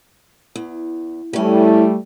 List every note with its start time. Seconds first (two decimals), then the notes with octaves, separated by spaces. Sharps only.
0.56 E2
1.33 E3 G3 A3 C#4